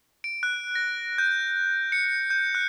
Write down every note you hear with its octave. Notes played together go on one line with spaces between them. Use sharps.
D7
F#6
A#6
G6
C#7
G6
F#6